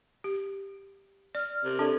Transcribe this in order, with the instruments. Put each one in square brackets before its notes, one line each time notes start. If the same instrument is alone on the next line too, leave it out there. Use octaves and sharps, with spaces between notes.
[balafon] G4
[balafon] D5 [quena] F6
[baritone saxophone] C3 [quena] A#4
[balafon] D4 [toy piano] A4 D5